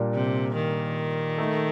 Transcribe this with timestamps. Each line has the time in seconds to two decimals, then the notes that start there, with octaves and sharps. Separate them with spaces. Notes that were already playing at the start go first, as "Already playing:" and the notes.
Already playing: A#2 G3 A#3 D4
0.14 C3
0.55 D#3
1.38 A3 D#4 A4